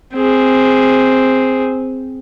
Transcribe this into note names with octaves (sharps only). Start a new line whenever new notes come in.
C4 G#4